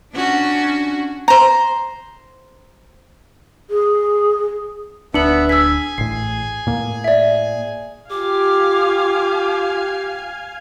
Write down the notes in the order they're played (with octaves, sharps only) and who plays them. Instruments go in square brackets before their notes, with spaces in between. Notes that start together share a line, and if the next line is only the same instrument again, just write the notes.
[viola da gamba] C#4 D4 F#4
[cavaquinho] C5 A#5
[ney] G#4
[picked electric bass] D1 D4 [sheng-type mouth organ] B3 E5 [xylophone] C#7 F#7
[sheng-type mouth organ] G#4 G#5 [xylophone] E6 B6
[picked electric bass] A1 A2 [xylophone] C7
[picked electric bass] A2 A#3
[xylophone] D5 E5
[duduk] F4 [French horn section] G4 [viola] F5 G#5 [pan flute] D6